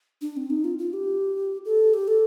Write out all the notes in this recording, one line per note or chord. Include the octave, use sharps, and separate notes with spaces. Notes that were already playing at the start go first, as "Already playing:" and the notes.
D4
C4
D#4
F4
F4
G4
A4
G4
A4